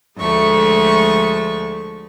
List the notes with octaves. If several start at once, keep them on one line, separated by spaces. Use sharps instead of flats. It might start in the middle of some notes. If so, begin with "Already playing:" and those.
D2 F3 G#3 A3 C#6